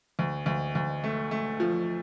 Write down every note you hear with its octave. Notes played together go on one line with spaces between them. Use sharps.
D2
D2
D2
A3
A3
F3